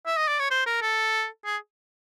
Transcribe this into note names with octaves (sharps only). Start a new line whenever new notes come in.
E5
D#5
D5
C#5
C5
A#4
A4
G#4